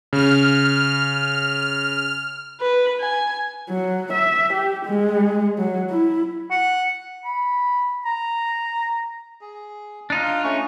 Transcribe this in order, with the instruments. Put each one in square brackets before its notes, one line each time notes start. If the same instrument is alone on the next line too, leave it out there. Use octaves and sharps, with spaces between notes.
[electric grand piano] C#3 [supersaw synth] F6
[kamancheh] B4
G#5
[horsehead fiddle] F#3
E5
G4
G#3
F#3
E4
[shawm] F#5
[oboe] B5
A#5
[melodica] G#4
[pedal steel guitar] D4 D#4 F4
[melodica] F5
A3 C#4 C#6